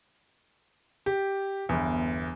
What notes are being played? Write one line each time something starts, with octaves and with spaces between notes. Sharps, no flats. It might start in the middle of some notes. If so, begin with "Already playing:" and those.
G4
G1 E2